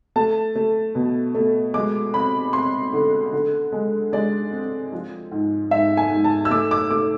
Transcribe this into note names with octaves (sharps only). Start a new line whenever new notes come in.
A3 A5
A3
B2
A3
G#3 D6
C4 B5
C4 C6
D3
D3
G#3
G#3 D5
C4
F3
G#2
G#2 E5
G#5
G#2
A5
E6
A3 D6
D6
A3 D6